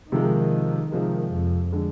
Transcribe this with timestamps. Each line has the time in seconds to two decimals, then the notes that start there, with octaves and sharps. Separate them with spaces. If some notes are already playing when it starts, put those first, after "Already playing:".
0.12 C3 D#3 F3 G#3
0.92 C3 D#3 F3 G#3
1.32 F2
1.72 D3 G#3